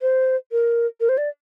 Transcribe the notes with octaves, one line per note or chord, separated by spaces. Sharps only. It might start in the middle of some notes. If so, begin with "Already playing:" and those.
C5
A#4
A#4
C5
D5